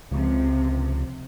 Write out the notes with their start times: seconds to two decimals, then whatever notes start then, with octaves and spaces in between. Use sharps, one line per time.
0.11 C#2 C3 F3